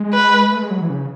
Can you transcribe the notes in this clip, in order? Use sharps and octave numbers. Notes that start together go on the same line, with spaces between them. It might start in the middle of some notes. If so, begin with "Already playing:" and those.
Already playing: G#3
B4
A3
G#3
F#3
E3
C#3